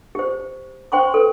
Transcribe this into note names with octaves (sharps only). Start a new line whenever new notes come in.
G4 C5
C5 G5 C6 C#6
A4 B4